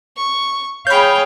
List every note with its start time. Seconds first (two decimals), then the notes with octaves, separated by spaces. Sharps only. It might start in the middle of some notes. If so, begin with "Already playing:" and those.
0.17 C#6
0.87 G#4 C#5 F5 G5 B5 G6